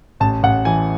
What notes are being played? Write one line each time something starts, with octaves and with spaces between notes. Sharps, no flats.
A1 A5
A1 F#5
E3 G#5